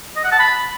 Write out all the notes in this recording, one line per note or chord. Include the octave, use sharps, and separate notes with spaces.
D#5
F#5
A5
B5